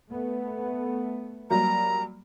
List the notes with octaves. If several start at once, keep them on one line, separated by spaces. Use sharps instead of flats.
A3 B3
F#3 G3 A#3 A#5